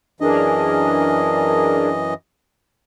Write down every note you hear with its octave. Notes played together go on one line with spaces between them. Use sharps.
F#2 E3 D4 G#4 A#4 D#5